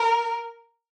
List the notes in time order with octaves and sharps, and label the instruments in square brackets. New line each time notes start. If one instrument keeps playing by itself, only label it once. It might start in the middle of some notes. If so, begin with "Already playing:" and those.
Already playing: [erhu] A#4